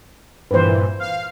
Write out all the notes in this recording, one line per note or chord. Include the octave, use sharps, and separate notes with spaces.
G2 A#2 E3 B4 C5
F5